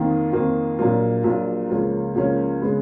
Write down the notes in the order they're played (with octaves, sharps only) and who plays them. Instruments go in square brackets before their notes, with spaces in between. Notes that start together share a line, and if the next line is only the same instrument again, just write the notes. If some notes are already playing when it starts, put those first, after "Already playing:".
Already playing: [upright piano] F2 D#3 A#3 F4
F2 D#3 A#3 F4
A#1 A#2 F#3 A#3 F4
A#1 A#2 F#3 A#3 F4
C#2 C#3 F3 A#3 C#4
C#2 C#3 F3 A#3 C#4
C#3 G#3 B3